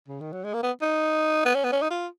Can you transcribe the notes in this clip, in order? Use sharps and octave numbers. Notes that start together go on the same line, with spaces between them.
C#3
D#3
F#3
G#3
A#3
B3
D#4
B3
C#4
B3
C#4
D#4
F4